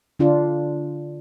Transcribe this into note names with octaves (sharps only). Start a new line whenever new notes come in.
D3 D4 F4